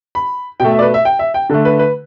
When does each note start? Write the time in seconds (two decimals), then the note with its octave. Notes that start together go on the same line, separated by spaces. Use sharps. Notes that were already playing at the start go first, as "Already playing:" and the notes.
0.15 B5
0.60 B2 A3 G5
0.71 E5
0.79 D5
0.82 B4
0.94 E5
1.05 G5
1.19 E5
1.34 G5
1.49 D3 A3 A4
1.65 B4
1.79 B4